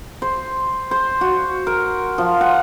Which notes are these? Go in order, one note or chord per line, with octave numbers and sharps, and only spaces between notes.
C5
C5
F#4
A#4
F3
F#5